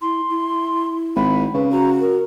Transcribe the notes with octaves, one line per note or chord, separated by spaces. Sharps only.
E4 C6
E4
G#1 B5
C#3 B4
F#4 A#5
A#4